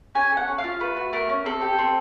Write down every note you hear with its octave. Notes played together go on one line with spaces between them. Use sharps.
C#4 G#5
A4
F#5
C#4
F5
F4
A3 B4
F#4
A3 A#4
C#4
C4 A4
G4
C4